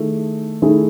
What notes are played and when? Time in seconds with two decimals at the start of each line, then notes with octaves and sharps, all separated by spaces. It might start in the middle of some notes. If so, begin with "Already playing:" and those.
Already playing: D#3 A3 E4 G#4
0.62 D#3 A3 E4 G#4